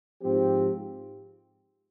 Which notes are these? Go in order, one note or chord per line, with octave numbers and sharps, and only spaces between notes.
G#2 F3 C4 G4